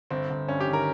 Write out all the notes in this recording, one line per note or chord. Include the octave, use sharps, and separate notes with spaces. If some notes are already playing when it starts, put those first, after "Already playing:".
G1 C4
G1
G2 C#4
G4
D#3
A#4